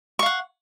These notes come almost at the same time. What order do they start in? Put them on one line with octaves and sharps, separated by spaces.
C#6 F5 F#5